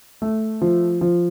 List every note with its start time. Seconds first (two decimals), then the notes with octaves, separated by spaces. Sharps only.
0.22 A3
0.61 F3
1.01 F3